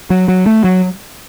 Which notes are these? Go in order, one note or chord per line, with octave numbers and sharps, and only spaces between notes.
F#3
F#3
A3
F#3